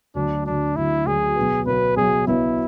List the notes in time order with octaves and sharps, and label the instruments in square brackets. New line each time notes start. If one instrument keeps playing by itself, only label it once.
[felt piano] D2 D3 F#3 [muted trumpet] D4
[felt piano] D2 D3 F#3 [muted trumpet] D4
[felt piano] D2 D3 F#3 [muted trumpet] E4
[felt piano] D2 D3 F#3 [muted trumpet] G#4
[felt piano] B1 B2 F#3 B3
[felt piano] B1 B2 F#3 B3 [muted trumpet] B4
[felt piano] B1 B2 F#3 B3 [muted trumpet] G#4
[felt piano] B1 B2 F#3 B3 [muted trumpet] E4